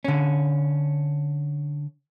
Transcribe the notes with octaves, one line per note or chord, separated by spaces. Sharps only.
D3 C#4